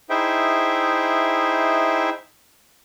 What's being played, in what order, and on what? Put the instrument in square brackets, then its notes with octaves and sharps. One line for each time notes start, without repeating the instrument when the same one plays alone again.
[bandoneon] D#4 E4 G#4 C5 E5 G5